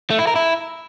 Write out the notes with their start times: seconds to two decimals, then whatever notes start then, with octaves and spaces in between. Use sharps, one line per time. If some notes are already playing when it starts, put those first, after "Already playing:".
0.10 A3
0.19 E4
0.27 A#4
0.36 E4